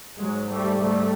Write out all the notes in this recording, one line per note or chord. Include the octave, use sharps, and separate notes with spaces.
G#2 F#3 G#3
G3 A3
G3 A3